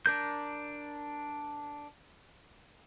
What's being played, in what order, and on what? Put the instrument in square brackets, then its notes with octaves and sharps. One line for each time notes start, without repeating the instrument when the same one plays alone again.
[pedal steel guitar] D4 A#4 G6